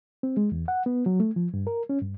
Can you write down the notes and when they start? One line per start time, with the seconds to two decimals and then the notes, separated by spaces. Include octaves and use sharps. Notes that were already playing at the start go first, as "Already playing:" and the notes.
0.23 C4
0.37 G#3
0.52 E2
0.68 F#5
0.86 B3
1.06 F#3
1.20 A3
1.36 F3
1.54 G2
1.67 A#4
1.89 C#4
2.02 G2